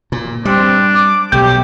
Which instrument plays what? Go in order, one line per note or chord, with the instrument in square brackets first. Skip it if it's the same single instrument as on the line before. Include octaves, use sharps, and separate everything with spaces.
[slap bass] A#2
[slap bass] G3 [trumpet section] C4 [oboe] D4
[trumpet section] D6
[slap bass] B1 [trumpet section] A3 G4 [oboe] G5 [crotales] G6